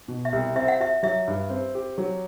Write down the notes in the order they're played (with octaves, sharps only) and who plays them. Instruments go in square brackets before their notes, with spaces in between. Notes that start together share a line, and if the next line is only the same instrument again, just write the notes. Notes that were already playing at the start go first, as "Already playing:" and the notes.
[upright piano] B2
[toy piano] E5
[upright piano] C2
[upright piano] C4 [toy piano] E5
[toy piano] F#5
[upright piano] F#4 [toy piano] E5
[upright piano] F#3 [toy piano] E5
[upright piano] G2
C4
G4
F#3